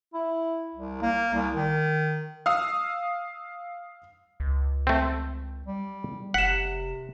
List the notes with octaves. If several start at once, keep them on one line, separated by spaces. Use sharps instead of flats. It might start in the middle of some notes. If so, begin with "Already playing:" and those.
E4
C2
A#3
C2
D#3
F5 D#6 E6 C7
C#2
A3 C4
G3
F1 C3 F#5 B6 E7